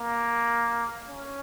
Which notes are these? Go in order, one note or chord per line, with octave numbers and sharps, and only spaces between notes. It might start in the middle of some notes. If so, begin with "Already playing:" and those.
Already playing: A#3
C#4